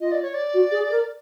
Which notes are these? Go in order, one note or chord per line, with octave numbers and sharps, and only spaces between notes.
F4 D#5
D5
C#5
D5
F#4
G#4
A#4